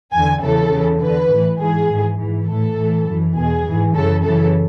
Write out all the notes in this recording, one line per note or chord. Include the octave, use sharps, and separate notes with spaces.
E2 D3 G#5
E2 C#3 E3 A4
E2 C#3 E3
E2 D3 B4
A2 E3
G#2 E3 G#4
G#2 E3
G#2 E3
A2 E3 A4
A2 E3
F#2 E3
E2 B2 G#4
G#2 E3
F#2 C#3 E3 A4
F#2 C#3 E3 A4